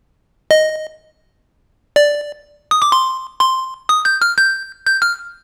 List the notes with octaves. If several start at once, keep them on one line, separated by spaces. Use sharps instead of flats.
D#5
D5
D#6
D6
C6
C6
D#6
G6
F6
G6
G6
F6